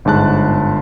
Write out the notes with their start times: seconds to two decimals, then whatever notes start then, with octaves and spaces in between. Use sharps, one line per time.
0.05 G1 G#2 A5 F#6